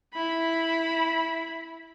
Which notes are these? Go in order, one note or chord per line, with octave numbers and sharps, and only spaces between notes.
E4 B5